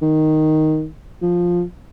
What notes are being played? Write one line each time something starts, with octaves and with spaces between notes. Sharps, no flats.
D#3
F3